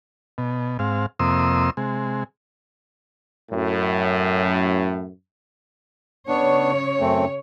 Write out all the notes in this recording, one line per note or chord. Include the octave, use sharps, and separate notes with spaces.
B2
G#2 C4 F5
F2 C3 A#3 C6 D#6 E6
C3 G#3
F#2 A2
C#3 B3 D4 C#5
F#2 A3 C4